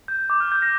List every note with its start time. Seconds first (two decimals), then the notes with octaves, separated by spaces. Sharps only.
0.08 G6
0.30 D6
0.40 F6
0.52 G6
0.62 A#6